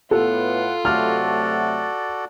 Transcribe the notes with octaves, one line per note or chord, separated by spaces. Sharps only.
A2 B3 F4 A4 F#5
C3 F#3 A3 F#4 A4 D5 F6